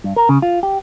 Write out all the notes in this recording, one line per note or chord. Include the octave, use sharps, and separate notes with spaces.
G2
A#4
C#3
F4
G4